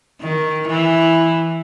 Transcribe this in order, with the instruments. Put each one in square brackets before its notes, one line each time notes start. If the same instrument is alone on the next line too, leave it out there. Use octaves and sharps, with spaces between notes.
[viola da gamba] D#3
E3